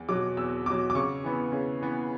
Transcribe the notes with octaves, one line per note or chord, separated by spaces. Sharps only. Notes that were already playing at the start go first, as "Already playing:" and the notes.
Already playing: E2
B2 F#3 D6
E2 E6
B2 F#3 D6
D6
C#3 C#6
E3 B3
C#3
E3 B3